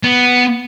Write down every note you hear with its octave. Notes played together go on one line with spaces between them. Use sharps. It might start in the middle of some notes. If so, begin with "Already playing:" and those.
B3